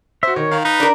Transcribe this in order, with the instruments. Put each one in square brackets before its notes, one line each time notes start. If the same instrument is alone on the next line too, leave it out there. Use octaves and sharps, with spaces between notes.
[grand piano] F#4 C5 [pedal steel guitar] E5
[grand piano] D#3 [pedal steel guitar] C#5
[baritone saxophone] D#3 [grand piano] F5
[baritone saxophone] D#4 [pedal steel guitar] B4
[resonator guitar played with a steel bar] D4 A#4